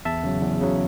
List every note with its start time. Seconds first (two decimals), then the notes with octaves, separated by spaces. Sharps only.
0.05 E2 E5 A5
0.24 C#3 F#3
0.42 E2
0.61 C#3 F#3